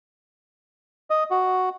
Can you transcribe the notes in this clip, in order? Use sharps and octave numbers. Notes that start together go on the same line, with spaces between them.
D#5
F#4